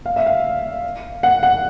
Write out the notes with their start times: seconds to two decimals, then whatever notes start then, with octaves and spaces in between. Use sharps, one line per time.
0.06 F5
0.16 E5
0.26 F5
1.23 F#5
1.43 F#5